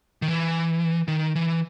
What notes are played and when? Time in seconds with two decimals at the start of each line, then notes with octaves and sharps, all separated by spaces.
0.22 D#3
0.28 E3
1.08 D#3
1.36 E3